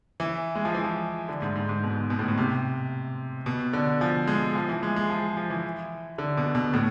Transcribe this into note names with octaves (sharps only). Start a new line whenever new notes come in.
E3
G#3
F3
E3
F3
D3
G#2
G#2
G#2
B2
B2
A2
B2
C3
B2
D3
F3
G#3
F3
E3
G#3
G#3
F3
F3
E3
D3
B2
B2
A2